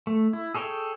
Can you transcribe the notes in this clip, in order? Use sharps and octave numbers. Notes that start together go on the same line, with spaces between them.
A3
E4
G#4 A4 C#5 D#5 G5